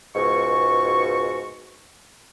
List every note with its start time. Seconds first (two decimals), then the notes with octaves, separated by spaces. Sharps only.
0.15 C#2 G#2 B2 F#4 C#6